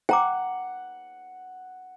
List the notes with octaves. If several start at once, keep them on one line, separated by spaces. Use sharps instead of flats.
F#5 G5 A#5 D6